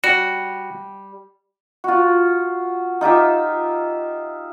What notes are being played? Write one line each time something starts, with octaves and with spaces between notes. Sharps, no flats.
G3 F#4
F4 F#4
D#4 F4 G4 E5